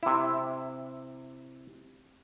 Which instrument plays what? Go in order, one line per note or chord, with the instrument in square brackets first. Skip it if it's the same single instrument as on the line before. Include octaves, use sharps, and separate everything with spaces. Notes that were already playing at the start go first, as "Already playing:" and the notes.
[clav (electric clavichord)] C3 E4